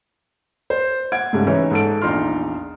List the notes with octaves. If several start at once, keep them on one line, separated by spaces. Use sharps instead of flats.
C5
F#5 G#6 D7
G#2 C#3 G3 A3
E3 C#4 D#4 B4 C#5 E5
G#2 A4 D7
A#1 E2 D#4 F4 C6 F6